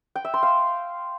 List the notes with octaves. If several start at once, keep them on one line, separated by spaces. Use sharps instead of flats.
G5
E5
C6
F5